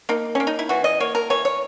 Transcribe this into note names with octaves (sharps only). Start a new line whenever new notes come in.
A#3 D#4
A#3 C#4
D#4
E4
E3 F#4
D#5
A#3 C#5
A#4
E3 C#5
C#5